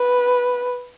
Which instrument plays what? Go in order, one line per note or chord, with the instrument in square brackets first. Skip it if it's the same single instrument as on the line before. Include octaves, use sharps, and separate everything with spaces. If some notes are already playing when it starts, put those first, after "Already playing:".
Already playing: [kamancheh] B4